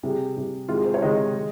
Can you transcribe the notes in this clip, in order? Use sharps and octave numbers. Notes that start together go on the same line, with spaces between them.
C3 G3 G#4
C3 G3
C3 D#3 G#3 F4
G#4
C5
C#5
C3 D#3 G#3 D#5
G#3